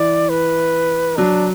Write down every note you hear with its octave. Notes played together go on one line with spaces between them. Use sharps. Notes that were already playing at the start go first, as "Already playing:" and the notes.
Already playing: E3 D5
B4
F#3 D4